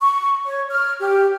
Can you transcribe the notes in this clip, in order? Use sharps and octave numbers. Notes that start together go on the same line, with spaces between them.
C#6
C#5
F6
G4